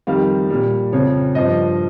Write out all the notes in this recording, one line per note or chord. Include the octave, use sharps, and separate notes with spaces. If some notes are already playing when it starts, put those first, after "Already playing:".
F2 D#3 G3 F5
A#2 G3
F2 C#3 F3 C#5
G2 F3 D#5